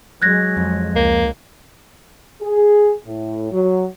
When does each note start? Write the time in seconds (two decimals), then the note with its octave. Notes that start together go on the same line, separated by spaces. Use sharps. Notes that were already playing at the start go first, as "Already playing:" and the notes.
0.22 F#3 G#3 F#6 G#6 A#6
0.57 F2
0.95 C#2 A#3
2.41 G#4
3.06 A2
3.52 F#3